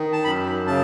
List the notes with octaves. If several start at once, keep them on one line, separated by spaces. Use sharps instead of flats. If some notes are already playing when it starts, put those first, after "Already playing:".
Already playing: D#3
A5
F#2 B5
C#3 A5